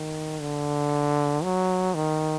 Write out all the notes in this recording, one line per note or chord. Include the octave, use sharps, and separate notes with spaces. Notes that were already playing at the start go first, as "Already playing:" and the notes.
Already playing: D#3
D3
F#3
D#3